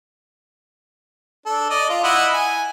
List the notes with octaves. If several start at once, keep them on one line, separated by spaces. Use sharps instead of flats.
D4 A4
D5 D#5
F4
E4 D#5 F#5
G#5